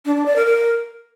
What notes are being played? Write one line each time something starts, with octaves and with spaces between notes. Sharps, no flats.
D4
D4
D5
A#4
A#4